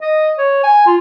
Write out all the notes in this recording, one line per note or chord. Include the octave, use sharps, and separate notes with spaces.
D#5
C#5
G#5
F4